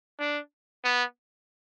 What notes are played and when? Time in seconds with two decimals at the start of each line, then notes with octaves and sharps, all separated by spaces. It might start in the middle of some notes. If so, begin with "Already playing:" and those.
0.19 D4
0.84 B3